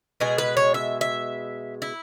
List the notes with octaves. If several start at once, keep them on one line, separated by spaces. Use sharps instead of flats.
B2 G#3 G#4
B4
C#5
E5
E5
E4